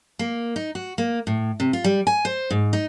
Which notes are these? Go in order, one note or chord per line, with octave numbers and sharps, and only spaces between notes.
A#3
D#4
F#4
A#3
A2
C3
F4
G3
G#5
C5
G#2
D#4